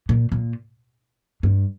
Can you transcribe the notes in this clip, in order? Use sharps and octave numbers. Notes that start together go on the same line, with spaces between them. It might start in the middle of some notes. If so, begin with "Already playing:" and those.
A#2
A#2
G2